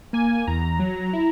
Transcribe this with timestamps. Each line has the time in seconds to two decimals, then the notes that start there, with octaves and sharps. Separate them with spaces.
0.13 A#3 G#5
0.47 E2 A#5
0.79 F#3
1.13 E4